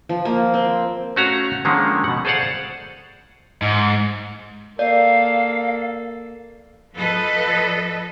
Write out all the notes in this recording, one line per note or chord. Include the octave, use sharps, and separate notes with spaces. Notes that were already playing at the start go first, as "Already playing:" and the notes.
F3
A#3
C4
A3 C#4 F#4 F5 A#5
D3 D#3 F3 G#3 A#3 C#4
B2 F#5
G#4 A4 C5 D5 F5 F#5
G#2
A#3 A4 D5 F5
F3 A4 B4 D#5